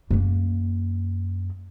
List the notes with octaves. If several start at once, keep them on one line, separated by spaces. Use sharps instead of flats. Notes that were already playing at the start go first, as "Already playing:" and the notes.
F#2 A#3